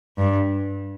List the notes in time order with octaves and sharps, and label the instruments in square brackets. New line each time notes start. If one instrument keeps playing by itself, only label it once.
[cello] G2